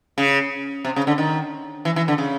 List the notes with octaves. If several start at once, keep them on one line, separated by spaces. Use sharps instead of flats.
C#3
C3
C#3
D3
D#3
E3
E3
D3
C#3